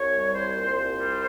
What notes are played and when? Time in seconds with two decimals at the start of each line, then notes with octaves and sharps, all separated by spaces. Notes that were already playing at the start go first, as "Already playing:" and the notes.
Already playing: C2 C#5
0.12 G3
0.33 C2 C5
0.55 A#2
0.76 C2 C5
0.98 G3